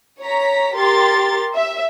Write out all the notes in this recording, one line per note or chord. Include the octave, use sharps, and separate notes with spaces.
C#5 A#5 B6
G4 A#4 C6 A6
E5